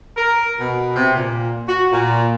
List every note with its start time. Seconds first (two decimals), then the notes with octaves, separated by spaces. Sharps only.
0.17 A#4
0.59 B2
0.95 C3
1.15 A#2
1.68 F#4
1.91 A#2